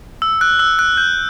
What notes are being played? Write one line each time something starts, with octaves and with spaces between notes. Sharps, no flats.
E6
F#6
E6
F#6
G6